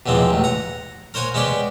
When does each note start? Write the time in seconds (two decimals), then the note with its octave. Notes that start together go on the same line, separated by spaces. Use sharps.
0.06 B1 E2 F3 G#3 C4
0.31 A1 A2
0.44 F#5 A#5
1.14 A#4 C5 C#5 F#5 G#5
1.34 G#3 B3 C#4 D5 G5